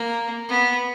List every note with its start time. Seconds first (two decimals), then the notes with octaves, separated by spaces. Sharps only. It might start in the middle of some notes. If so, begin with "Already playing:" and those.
Already playing: A#3
0.49 B3